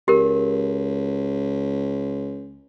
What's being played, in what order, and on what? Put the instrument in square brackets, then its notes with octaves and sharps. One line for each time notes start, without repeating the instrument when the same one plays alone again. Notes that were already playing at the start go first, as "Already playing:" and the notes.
[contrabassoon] C#2 [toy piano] G4 A#4